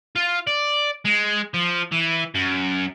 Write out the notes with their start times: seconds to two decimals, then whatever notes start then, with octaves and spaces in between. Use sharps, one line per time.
0.15 F4
0.47 D5
1.05 G#3
1.54 F3
1.92 E3
2.35 F#2